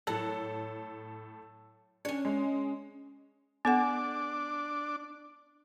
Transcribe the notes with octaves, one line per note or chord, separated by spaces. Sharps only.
A2 F#3 A4 F#5
C#4 D4 C#5
G#3
B3 D4 A4 F#5 D6